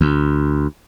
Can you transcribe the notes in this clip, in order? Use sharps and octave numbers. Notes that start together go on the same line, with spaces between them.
D2